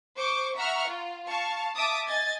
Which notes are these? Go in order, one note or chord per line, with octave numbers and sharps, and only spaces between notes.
C5 C#6 D6
E5 F#5 A#5 C#6 F6
F4
F5 A5 C#6
E5 A5 D6 D#6
D#5 G#5 G#6 A6